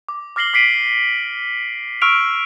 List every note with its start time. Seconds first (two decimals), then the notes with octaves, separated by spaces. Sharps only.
0.09 D6
0.36 D6 F6 A#6 C7 F#7 G7
0.54 D6 B6 C7 D7 D#7 F#7
2.01 C#6 E6 F6 D7 F7